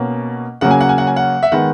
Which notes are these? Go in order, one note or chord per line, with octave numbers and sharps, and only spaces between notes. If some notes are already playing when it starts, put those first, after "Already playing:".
Already playing: B2 A#3 C#4
C#3 F#3 A#3 C#4 F#5
G#5
F#5
G#5
F#5
G#5
F#5
E5
D#3 G#3 B3 F#5